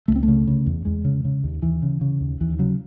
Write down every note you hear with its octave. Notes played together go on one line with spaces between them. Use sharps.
C#2 A3
C4
A3
C#3
C#3
E2
E2 G#3
C#3
C#3
D#2
D#2 E3
C#3
C#3
D#2
D#2 E3
C#3 F#3